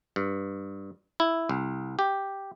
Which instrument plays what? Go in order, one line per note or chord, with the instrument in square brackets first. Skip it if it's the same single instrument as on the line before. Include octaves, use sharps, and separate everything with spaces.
[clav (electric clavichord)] G2
E4
C2
G4